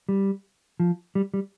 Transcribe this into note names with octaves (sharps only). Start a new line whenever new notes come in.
G3
F3
G3
G3